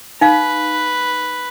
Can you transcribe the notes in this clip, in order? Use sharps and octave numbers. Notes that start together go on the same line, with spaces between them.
D#4 B4 F5